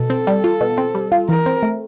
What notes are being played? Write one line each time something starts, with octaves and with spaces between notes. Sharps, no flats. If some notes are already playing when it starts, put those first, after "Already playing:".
Already playing: B2 A4
C4
G3
F4
B2
C4
G3
F4
E3 A#4
C4
A3